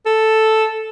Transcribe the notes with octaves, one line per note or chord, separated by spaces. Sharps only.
A4